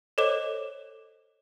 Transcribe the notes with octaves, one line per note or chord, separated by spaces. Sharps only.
A4 C5 C#5 D#5 D6 E7